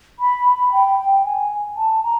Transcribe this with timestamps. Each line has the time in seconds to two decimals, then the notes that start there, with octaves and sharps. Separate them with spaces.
0.19 B5
0.46 B5
0.72 G5
0.99 G5
1.25 G#5
1.77 A5
2.04 A#5